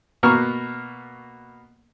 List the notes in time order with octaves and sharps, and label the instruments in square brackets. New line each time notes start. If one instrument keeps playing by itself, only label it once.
[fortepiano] B2 A#3 B3 A#5 C#6 F6